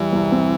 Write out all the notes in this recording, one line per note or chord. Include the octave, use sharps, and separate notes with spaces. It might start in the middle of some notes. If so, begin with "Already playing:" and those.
Already playing: E2 E3 G3
C2
C4